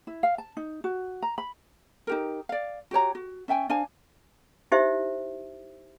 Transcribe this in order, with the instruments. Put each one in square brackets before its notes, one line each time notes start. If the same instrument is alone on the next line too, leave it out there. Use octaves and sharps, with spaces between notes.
[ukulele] E4
F5
A5
D#4
F#4
A#5
B5
D#4 G4 A#4
D5 F5
F#4 G4 C#5 A#5
F#4
C#4 E5 G5 G#5
D4 C5 F5 G#5
[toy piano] D#4 E4 G4 C5 E5